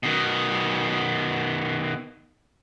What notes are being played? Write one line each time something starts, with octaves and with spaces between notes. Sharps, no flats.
B2 D#3